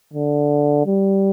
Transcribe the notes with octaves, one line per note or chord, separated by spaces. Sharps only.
D3
G3